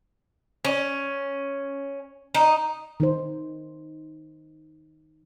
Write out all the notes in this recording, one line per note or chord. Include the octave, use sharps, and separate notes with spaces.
C#4
D#4
D#3 D#4 C5